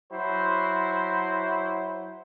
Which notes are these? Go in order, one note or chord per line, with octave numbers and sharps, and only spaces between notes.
F#3 E4 C5